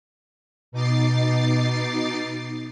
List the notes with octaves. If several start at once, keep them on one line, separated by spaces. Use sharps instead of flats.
B2 D#4 D6 A6 C7